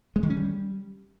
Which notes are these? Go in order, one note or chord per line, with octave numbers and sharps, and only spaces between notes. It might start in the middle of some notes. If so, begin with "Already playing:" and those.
G#3
D#3
C#4
G3